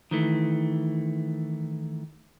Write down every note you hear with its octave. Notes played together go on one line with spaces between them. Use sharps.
D#3 E3 A3